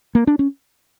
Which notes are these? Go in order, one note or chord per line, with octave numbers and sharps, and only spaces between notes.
A#3
D4
C#4